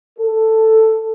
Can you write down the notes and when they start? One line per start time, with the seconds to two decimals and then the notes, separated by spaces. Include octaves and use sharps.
0.19 A4